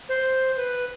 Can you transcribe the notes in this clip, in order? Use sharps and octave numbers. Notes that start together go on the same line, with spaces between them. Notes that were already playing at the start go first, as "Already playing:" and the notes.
C5
B4